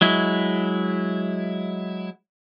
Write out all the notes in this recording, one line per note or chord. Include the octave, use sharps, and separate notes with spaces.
F#3 G#3 E4